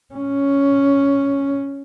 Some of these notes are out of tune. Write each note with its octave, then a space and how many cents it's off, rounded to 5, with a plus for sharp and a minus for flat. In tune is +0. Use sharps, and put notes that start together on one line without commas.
C#4 +5